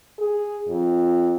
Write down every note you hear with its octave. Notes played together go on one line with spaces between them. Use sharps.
G#4
F2